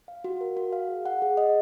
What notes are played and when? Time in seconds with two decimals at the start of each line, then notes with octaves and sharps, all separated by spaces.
0.08 F5
0.24 F#4
0.41 A#4
0.57 F#4
0.73 F5
0.89 G#4
1.06 F#5
1.22 G#4
1.37 D#5